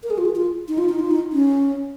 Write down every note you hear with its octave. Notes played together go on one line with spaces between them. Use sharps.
A#4
G#4
F4
G#4
F4
D#4
F4
D#4
F4
D#4
C#4